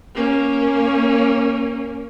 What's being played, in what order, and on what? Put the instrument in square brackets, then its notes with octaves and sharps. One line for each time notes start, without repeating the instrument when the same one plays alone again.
[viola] A#3 C#4